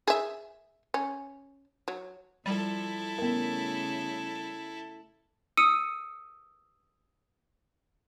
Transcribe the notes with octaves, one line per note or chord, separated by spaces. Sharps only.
G#4 E5
C#4
F#3
F3 G3 E4 A4
C#3 A3 B3 A#4
D#6 E6 C#7 D#7